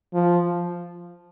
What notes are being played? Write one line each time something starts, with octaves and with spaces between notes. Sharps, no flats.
F3